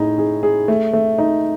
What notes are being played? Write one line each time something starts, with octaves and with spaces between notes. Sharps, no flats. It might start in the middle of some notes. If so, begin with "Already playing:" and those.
Already playing: A2 D#4 G#4
G#4
G#4
A3
A3
D#4